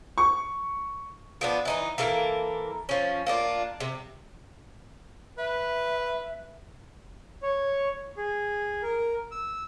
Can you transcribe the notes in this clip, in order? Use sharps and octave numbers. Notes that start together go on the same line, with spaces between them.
C#6
F3 B3 D4
E3 D#4 B4
E3 A#3 A4 A#4
F3 C#4
A#3 C#4 D4 F4
C3
B4 E5
C#5
G#4
A#4
E6